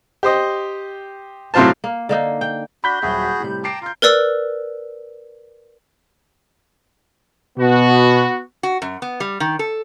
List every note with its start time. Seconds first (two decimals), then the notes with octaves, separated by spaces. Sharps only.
0.23 G4 C5 D#5
1.54 A2 C3 F#3 F4 C5 A5
1.84 A#3
2.09 D3 A#3 D#4
2.41 G5
2.84 D4 F#4 B5 G6 B6
3.02 D#1 F#3 F#4 G#4 E5
3.40 A2 C3 G3
3.64 G5 A5 A#5 D6 C7 D7
3.82 F4 A#5 G6
4.02 A#4 B4 D5 E6
7.59 B2 B3 F#4
8.63 F#4
8.82 F#2
9.02 B3
9.20 G3
9.40 D#3
9.59 A4